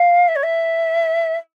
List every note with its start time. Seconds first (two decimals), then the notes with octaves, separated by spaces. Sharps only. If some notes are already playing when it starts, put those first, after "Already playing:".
Already playing: F5
0.28 E5
0.36 C#5
0.44 E5